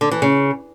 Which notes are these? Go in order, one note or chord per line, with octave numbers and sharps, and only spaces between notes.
D3
E3
C#3